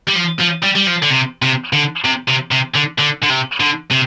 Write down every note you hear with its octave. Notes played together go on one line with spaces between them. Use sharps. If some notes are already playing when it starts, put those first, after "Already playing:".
G3
F3
F3
G3
G3
F3
D3
C3
C3
D3
C3
C3
C3
D3
D3
D3
C3
D3
C3